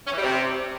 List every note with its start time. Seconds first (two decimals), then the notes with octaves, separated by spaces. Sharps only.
0.07 C#4
0.12 E3
0.18 G3
0.23 C3